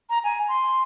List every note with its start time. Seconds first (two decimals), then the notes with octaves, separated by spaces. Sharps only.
0.10 A#5
0.24 G#5
0.48 C6